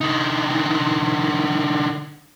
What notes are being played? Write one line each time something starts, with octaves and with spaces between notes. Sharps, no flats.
D3 D#4